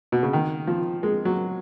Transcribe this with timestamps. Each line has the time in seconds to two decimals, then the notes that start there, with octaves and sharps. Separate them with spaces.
0.12 B2
0.23 C#3
0.33 D#3
0.67 F3
1.03 G#3
1.25 F#3